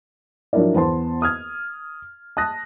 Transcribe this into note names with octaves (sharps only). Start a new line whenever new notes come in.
F3 F#3 D4 E4 A#4 D5
E2 B3 C5 A5 C6
D#6 F6 G#6
A5 D#6 F#6 A#6